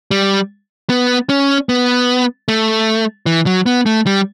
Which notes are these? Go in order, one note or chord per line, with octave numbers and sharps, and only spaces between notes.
G3
B3
C#4
B3
A3
E3
F#3
B3
A3
G3